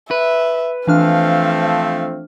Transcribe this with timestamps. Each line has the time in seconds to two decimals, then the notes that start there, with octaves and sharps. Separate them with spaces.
0.11 B4 E5
0.87 E3 F3 A3 C4 D4 F5 F6